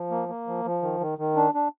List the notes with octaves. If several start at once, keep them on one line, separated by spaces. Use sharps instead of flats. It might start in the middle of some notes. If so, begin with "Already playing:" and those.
Already playing: F3
A#3
A#3
F3
F3
D#3
D#3
D#3
D4
D4